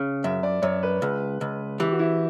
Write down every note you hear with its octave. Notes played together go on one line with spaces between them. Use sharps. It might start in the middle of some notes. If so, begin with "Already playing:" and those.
Already playing: C#3
F#2 E5
D5
F#2 C#5
B4
C#2
C#2
E3 G4
F#4
E4